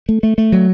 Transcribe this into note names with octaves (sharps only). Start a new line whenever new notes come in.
A3
A3
A3
F#3